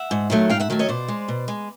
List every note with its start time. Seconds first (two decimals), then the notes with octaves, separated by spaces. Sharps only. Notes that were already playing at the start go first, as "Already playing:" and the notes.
Already playing: E5 F#5
0.11 G#2
0.30 D#3 F#3 A3
0.50 G#2 F5 G5
0.60 E5 F#5
0.70 D#3 F#3 A3
0.79 C#5 D#5
0.89 B2 C5 D5
1.08 G#3
1.28 B2
1.48 G#3